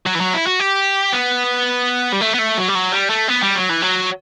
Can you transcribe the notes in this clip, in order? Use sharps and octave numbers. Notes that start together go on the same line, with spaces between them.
F#3
E3
F#3
E4
F#4
G4
B3
G3
A3
B3
A3
F#3
G3
F#3
G3
A3
B3
G3
F#3
E3
F#3